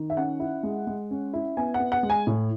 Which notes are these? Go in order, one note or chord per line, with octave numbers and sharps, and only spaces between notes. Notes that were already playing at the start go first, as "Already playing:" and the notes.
Already playing: D#3
E5
C#4 F#5
E4
G#3
G#3
C#4
E4
B3 G#5
F#5
B3
F#5
G#3
G#5
A2